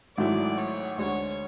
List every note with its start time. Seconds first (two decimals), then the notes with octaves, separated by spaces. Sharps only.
0.17 G#1 G#2 F#3 A3 E4 D5
0.58 C#5
0.98 D2 D3 G#3 C#5